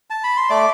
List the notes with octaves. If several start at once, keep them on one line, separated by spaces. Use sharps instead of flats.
A5
B5
C6
A3 D5 D6